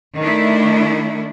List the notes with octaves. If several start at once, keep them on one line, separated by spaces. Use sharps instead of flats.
D#3 A3 D4 E4